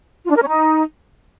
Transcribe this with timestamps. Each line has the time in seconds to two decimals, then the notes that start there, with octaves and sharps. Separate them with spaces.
0.24 F4
0.30 D4
0.36 A#4
0.42 C#4
0.48 D#4